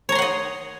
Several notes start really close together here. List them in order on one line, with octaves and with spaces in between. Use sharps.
C#5 A#5 C6 F#5 D#5